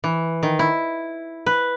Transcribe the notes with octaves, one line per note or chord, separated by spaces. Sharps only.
E3
D#3
E4
B4